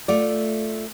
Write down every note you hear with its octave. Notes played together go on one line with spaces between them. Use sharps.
A3 F4 D5